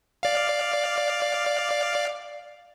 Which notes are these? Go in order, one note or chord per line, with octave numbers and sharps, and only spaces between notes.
D5 F5